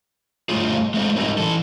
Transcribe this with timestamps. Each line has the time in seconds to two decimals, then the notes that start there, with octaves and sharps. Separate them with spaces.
0.49 G2 C3 A3 F4 G#4
0.94 G#3 A3 C4
1.16 G#2 G3 D#4 A#4 E5
1.38 E3 A4